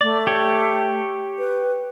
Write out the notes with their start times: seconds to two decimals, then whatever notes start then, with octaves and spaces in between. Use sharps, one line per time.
0.01 A3 D5
0.27 G4 C#5
1.39 B4